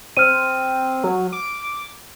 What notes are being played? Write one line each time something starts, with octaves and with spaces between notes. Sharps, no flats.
C4 F6 D#7
F#3
D6